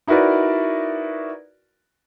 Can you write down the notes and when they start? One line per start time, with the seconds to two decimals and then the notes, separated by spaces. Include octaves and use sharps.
0.07 D#4 E4 F#4 A#4 B4 D5